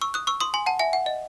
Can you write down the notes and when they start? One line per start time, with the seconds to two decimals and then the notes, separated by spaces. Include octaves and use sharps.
0.01 C#6 E6
0.14 D#6 F#6
0.27 C#6 E6
0.40 C6 D#6
0.54 G#5 C6
0.66 F#5 A5
0.79 E5 G#5
0.93 F#5
1.06 D#5